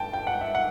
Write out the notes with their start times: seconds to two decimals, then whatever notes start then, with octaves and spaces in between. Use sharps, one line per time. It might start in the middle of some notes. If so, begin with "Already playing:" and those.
Already playing: G1 G2 G5 A5
0.13 G5
0.27 F#5
0.41 E5
0.55 F#5